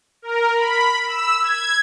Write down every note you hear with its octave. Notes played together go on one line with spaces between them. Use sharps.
A#4
B5
E6
G#6